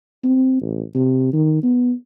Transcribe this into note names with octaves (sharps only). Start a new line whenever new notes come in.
C4
A1
C3
D#3
B3